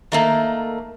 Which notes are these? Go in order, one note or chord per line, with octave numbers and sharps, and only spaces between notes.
D#3 A3 A#3